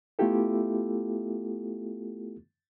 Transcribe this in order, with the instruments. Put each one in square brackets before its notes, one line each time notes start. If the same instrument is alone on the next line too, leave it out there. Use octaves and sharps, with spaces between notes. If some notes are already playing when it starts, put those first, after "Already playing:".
[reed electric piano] A3 B3 E4 F4 G4 A4